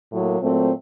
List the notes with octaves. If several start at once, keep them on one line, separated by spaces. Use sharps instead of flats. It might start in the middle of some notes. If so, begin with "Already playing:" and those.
A2 F#3 A#3
A#2 F#3 A3 C4